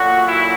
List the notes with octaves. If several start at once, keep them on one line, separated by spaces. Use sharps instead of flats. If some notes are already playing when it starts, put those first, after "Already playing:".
Already playing: A#2 F#3 A3 F#4
E4